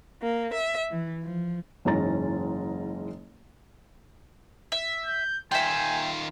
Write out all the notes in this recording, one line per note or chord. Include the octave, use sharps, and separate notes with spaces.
A#3
E5
E3
F3
F#1 G#2 E3 C#4 A#5 A6
E5
G6
D#3 F4 E5 G5 G#5